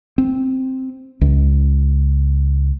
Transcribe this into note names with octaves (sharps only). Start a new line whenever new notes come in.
C4
C#2